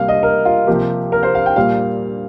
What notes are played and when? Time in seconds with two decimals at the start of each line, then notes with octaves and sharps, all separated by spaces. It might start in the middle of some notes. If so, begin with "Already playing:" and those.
Already playing: C3 G3 A#3 F5
0.08 D#5
0.23 A#4
0.45 F4
0.67 C3 F3 A#3 G4
1.12 A#4
1.23 C5
1.35 F5
1.46 G5
1.56 A#2 G3 A#3 F5